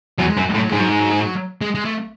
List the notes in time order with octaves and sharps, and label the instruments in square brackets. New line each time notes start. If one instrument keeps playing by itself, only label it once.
[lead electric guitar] E2 [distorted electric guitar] F#3
[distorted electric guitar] G#3
[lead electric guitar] F#2 [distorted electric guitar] F#3
[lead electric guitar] A2 [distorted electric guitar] G#3
[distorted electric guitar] F#3
[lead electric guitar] G#2 [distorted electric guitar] G#3
[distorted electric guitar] F#3
G#3
F#3
G#3
F#3
G#3
G#3
A3